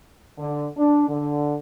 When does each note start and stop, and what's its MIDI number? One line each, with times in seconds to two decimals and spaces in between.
0.38 0.67 50
0.77 1.05 62
1.08 1.56 50